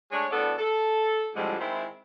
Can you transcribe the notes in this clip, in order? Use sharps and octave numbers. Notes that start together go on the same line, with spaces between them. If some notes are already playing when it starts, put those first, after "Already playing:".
G#3 A3 D4 C#5
D2 A2 B3 A4 D5
A4
F2 A2 D3 F3 G3 G#3
D#3 G#3 C4 E4